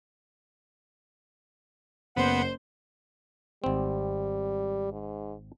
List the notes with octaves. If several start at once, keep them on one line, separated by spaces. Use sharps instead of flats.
F#1 B3 C5 F#5
G#1 G3 C4
G#2